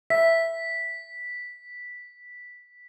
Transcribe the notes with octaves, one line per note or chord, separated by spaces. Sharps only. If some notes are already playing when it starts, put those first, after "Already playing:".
E5 B6